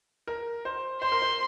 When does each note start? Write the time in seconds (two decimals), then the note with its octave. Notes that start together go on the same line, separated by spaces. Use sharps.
0.27 A#4
0.65 C5
1.02 C5 C6
1.12 A#4
1.22 C5